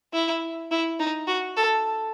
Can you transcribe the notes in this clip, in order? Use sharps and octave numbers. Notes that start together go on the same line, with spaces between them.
E4
E4
D#4
F#4
A4